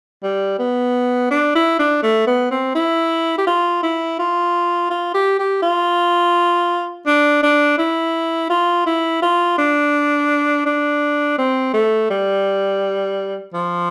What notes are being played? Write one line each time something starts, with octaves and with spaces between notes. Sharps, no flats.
G3
B3
D4
E4
D4
A3
B3
C4
E4
G4
F4
E4
F4
F4
G4
G4
F4
D4
D4
E4
F4
E4
F4
D4
D4
C4
A3
G3
F3